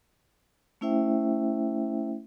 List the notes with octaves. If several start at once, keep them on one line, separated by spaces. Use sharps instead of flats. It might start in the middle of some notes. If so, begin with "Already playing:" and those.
A3 C#4 E4 C5 E5 G5